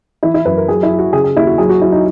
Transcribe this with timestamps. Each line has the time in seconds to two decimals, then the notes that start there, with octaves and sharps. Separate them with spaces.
0.23 E3 E4
0.34 E4
0.45 F#2 B4
0.57 A#4
0.68 F#3 G#4
0.83 E4
0.91 F#3
0.98 F#4
1.13 C#3 G#4
1.24 G#4
1.36 D#2 E4
1.47 F#4
1.58 F#3 G#4
1.69 F#4
1.82 F#3 E4
1.92 D#4